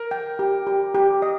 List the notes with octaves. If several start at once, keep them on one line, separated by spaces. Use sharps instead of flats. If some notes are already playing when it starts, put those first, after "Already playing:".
Already playing: A#4
G5
G4
G4
G4
D#5